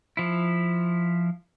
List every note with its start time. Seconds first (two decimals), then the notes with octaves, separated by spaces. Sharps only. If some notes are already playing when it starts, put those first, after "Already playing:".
0.17 F3 E4